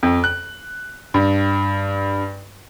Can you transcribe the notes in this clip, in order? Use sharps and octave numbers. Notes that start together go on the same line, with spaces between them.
F2
F#6
G2